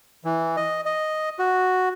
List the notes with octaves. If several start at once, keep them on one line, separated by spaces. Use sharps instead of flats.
E3
D#5
D#5
F#4